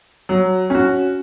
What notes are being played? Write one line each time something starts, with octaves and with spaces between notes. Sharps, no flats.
F#3
C#4 F#4